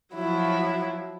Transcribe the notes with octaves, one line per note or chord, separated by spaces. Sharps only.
F3 F#3 E4